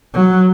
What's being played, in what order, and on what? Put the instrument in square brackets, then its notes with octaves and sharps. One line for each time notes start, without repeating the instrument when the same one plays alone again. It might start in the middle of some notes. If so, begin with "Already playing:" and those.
[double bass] F#3